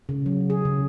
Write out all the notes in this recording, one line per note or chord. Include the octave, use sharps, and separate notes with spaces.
C#3
F#3
G#4
C#3